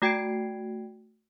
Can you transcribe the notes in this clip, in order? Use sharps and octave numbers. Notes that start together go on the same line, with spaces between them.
A3 F#4 G5 G#6 C7 D7